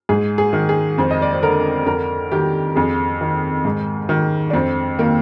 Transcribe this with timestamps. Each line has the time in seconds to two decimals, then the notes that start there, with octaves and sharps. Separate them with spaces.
0.09 G#2 G#4
0.38 G#4
0.53 D#3
0.69 G#4
0.98 F2 C5
1.11 D#5
1.22 D5
1.32 C5
1.43 D3 A#4
1.86 F2 A#4
2.32 D#3 G4
2.75 F2 G#4
3.21 D#3
3.65 G#2
4.09 D#3
4.50 D4
4.53 F2 C4
4.99 D#3 A#3